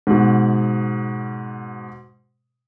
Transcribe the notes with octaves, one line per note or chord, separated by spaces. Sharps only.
G#2 B2